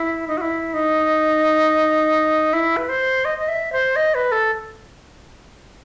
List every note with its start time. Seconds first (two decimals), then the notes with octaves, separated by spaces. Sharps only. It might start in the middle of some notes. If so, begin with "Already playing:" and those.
Already playing: E4
0.28 D#4
0.37 F#4
0.41 E4
0.74 D#4
2.53 E4
2.77 B4
2.89 C5
3.25 D#5
3.38 D#5
3.48 E5
3.72 C5
3.96 D#5
4.15 B4
4.32 A4